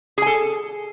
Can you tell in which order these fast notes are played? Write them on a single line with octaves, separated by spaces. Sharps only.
G#4 G#5 A4